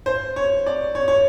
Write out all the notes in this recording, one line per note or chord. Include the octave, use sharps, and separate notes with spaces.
C5
C#5
D5
C#5
C#5